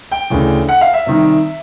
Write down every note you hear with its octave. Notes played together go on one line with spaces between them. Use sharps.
G5
D2 C#3 E3
F#5
F5
E5
C3 D#3 G3